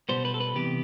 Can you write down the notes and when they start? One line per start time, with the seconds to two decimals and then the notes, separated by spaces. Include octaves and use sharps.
0.09 B2 G3 B3 C5
0.25 B4
0.34 A4
0.40 B4
0.55 C3 E3 B3 G4